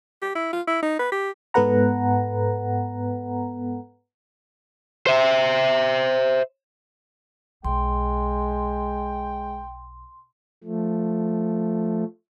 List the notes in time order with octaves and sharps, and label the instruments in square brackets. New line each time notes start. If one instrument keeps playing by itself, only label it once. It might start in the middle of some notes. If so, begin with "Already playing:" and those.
[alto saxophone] G4
E4
F4
E4
D#4
B4
G4
[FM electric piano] G#2 B3 A4 B4 F#5 A#5
[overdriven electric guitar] C5 E5
[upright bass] B1 [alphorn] G#3 [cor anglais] G5 [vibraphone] C6
[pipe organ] F3 A3